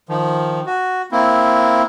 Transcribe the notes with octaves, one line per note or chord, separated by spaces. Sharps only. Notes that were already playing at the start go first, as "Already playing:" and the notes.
D#3 F3
F#4
A#3 C4 E4